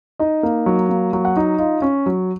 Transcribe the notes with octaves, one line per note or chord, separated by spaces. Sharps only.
D#4 D#5
A#3
F#3
A#3
F#3
F#5
D#4
F4 D#5
C#4
F#3